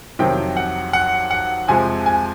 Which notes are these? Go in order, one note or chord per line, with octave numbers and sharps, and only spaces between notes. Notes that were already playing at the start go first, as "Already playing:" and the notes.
F2 C3 D#3 F#3 G5
F#5
F#5
F#5
F2 C3 F3 G#3 G#5
G#5